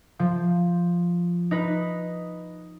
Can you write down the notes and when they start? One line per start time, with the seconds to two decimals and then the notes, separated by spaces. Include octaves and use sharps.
0.19 F3
1.51 D#4 B4